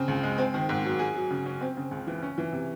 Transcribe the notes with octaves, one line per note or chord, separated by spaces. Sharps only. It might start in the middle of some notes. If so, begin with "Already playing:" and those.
Already playing: C#3 C4
C#2
G#3
C4
D#3
G#2
F#3
G#4
F#3
C#3
C#4
C4
C#3
C#2
E3
C#4
E3
C3